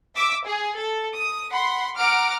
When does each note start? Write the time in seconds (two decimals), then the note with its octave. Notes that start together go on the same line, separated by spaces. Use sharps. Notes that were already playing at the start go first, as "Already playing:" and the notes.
0.16 E5 D6 E6
0.45 G#4
0.76 A4
1.16 D#6
1.51 F#5 B5 C6
1.99 F#5 A#5 D6 F6 D7